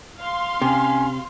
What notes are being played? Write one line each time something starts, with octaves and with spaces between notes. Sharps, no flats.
F5 C6
C3 C#4